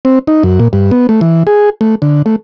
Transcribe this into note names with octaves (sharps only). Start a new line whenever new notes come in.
C4
D#4
F#2
A#2
G2
B3
A3
E3
G#4
A3
D3
A3